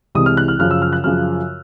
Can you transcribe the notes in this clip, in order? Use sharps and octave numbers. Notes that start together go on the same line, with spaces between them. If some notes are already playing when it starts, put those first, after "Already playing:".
C2 C3 E3 G#3 D#6
F6
F#6
F6
F#2 C#3 F3 F6
E6
F6
F#6
F#2 C#3 F3 F6